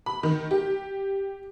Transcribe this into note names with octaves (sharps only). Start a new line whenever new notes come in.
B5
D#3
G4